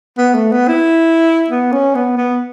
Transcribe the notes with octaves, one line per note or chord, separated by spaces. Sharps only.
B3
A3
B3
E4
B3
C#4
B3
B3